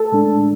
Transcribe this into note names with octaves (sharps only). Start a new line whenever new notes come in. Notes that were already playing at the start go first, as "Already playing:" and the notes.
Already playing: A4
A2 G#3 D4